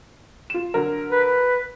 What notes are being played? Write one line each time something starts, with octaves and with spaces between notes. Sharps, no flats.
F4 E7
D3 F#3 A#4
B4